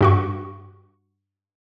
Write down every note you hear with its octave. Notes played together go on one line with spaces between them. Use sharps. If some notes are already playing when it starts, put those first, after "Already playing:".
G2 F#4 C#6